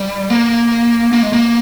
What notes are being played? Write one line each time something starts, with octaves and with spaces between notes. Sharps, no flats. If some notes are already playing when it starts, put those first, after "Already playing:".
Already playing: G3
A#3
A#3
G#3
A#3